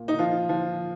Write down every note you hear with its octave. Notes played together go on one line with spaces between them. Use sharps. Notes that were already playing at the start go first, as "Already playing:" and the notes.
Already playing: A#2
D#4
F3 F4
F3